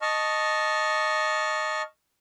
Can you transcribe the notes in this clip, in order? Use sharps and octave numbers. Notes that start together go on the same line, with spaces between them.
D#5 A5 C#6 F6